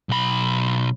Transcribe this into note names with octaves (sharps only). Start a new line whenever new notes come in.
B1 B5